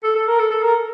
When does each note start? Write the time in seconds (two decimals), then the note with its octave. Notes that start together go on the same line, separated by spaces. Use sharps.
0.03 A4
0.15 A4
0.27 A#4
0.39 A4
0.51 A4
0.63 A#4